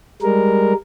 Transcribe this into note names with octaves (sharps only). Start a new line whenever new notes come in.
G3 G#3 A#4